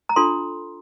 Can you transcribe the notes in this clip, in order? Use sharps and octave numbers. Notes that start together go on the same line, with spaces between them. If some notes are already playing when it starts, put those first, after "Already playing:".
A#5
D4 F4 A4 C6